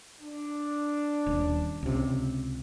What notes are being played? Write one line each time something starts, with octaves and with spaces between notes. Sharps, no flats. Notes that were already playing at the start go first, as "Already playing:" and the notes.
D4
D#1
C#2 C3